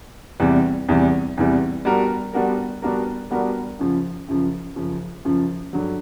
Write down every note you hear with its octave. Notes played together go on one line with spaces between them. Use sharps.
E2 C3 E3 G3
E2 C3 E3 G3
E2 C3 E3 G3
G3 B3 D4 F#4 A#4
G3 B3 D4 F#4 A#4
G3 B3 D4 F#4 A#4
G3 B3 D4 F#4 A#4
F#2 C#3 F3
F#2 C#3 F3
F#2 C#3 F3
F#2 C#3 F3
G2 D3 F#3